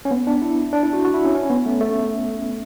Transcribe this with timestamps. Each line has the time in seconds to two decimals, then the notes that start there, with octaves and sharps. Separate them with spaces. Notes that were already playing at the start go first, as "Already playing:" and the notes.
0.05 C#4
0.11 B3
0.27 D4
0.42 E4
0.73 D4
0.83 E4
0.93 F#4
1.05 F#4
1.14 E4
1.25 C#4
1.35 C#4
1.50 B3
1.66 A3
1.81 A3